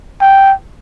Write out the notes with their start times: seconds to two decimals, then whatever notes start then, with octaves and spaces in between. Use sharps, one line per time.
0.21 G5